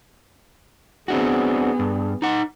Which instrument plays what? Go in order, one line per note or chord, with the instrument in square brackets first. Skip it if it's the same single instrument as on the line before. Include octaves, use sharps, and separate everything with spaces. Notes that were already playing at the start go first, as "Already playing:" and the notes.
[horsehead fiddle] B3 G#4 [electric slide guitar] C4 D4 F#4
[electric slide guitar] G2
D#4 F#5